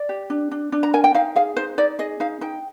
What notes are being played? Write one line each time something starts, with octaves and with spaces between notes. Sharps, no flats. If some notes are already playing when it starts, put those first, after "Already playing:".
Already playing: D5
G4
D4
D4
D4
A#5
A#4 G#5
G5
D#4 F5
G#4 F5
D#4 C5
D#4 D5
G#4 D#5
D#4 F5
D#4 G5